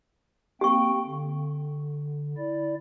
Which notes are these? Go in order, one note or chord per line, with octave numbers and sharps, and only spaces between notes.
A#3 C4 G4 G5 C#6
D3
E4 D5